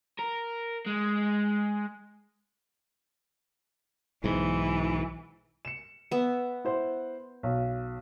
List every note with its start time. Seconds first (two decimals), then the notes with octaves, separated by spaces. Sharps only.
0.19 A#4
0.87 G#3
4.24 B1 G#2 E3
5.65 C#7 E7
6.11 B3 E5
6.65 E4 C5 F#5
7.43 B1